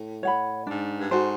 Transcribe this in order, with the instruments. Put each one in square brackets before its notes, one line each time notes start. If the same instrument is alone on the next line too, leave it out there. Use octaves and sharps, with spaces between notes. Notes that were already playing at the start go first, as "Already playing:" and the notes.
Already playing: [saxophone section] A2
[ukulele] C#5 F#5 B5
[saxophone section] G#2 [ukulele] D4
[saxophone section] G2
[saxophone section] G#2 [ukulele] F#4 A4 C5